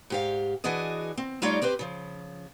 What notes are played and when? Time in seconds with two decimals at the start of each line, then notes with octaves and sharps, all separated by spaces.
0.10 G#2 G4 F5
0.64 E3 D4 F#4 G#4 D#5
1.17 C4
1.42 G3 A3 D#4 F4 C#5 D5
1.62 C4 G4 B4 C5
1.79 C#3 F3